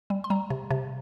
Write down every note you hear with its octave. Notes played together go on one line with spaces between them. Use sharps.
G3
C6
G3 A#5
C3
C3